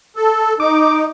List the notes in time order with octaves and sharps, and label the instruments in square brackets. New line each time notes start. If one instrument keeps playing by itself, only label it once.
[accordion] A4
[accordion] D#4 [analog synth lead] D6